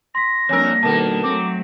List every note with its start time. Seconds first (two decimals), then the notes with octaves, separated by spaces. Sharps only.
0.15 C6 A#6 B6
0.49 F2 G3 A#3 D4 A#4 C#5 G#5 E6
0.83 B2 D#3 A4 A#4 A5
1.23 F#3 A3 C4 D6